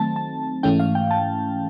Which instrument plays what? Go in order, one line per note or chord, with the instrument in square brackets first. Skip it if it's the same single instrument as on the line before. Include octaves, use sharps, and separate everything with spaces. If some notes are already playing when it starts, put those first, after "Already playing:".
Already playing: [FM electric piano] D#3 F#3 A3 C4 A5
A5
G#2 E3 A3 C#4 G5
F5
G5
A5